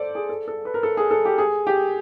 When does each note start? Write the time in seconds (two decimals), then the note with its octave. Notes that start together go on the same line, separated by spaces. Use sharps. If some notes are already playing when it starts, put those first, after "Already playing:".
Already playing: A4 C5 D5
0.15 G#4
0.29 A4
0.48 A4
0.65 B4
0.74 A#4
0.83 A4
0.97 G#4
1.11 A4
1.25 G4
1.38 G#4
1.67 G4